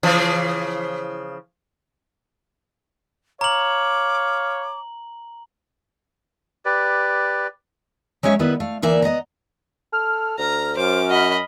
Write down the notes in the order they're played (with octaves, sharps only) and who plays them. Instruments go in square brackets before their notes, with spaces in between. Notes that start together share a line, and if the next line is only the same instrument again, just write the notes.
[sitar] C#3 E3 F3
[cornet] C#5 [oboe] F5 [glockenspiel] A#5 F#7 [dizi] D6
[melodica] G4 B4 D5
[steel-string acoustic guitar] F#3 G#3 C#4 C#5 E5
D#3 G3 B3 E4 B4
A3 F5
D2 E3 A#3 D5 E5
B3 D#5 F#5 A#5
[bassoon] A4 [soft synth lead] F6
[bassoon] D2 [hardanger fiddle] A#5
[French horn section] F#2 [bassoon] C5 [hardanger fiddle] D6
[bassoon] F#4 [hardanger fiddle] D#5 B5